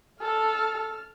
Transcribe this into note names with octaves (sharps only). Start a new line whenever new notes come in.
A4 F6